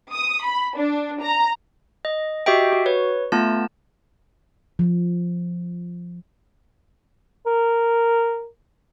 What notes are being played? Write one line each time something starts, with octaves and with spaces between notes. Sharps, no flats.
D#6
B5
D4
A#5
D#5
F#4 G4 D#5 E5 G5
F#4
B4 C#5
A3 B3 F4 A5
F3
A#4